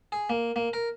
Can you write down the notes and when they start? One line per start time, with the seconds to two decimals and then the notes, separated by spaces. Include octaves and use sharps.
0.12 G#4
0.30 A#3
0.56 A#3
0.73 A#4